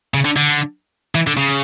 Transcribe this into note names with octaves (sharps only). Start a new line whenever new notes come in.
C#3
D3
D3
E3
D3
C#3